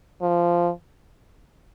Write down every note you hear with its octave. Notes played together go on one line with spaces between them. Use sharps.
F3